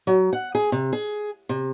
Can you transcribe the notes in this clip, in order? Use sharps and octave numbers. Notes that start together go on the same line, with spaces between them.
F#3
F#5
G#4
C3
G#4
C3